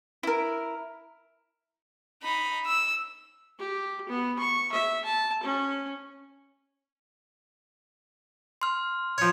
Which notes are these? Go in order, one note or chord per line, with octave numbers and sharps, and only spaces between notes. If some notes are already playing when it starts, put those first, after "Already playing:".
E4 A#4
D#4 B5
E6
G4
B3
C#6
E5
A5
C#4
C6 F6
F3 C#5